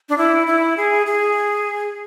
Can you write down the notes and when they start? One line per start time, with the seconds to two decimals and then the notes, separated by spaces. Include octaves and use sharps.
0.09 D4
0.18 E4
0.47 E4
0.77 G#4
1.07 G#4